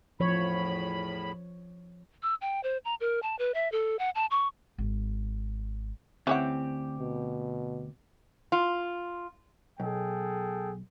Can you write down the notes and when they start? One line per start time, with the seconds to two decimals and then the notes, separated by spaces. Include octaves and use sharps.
0.20 E2 A2 F3 C#5 B5
2.23 E6
2.41 G5
2.64 C5
2.85 A#5
3.01 A#4
3.22 A5
3.39 B4
3.54 E5
3.72 A4
3.99 F#5
4.15 A5
4.31 C#6
4.78 G#1
6.27 D2 E3 C4 C#4 G4 F#5
6.99 B2
8.52 F4
9.80 B1 G#4 A4 G5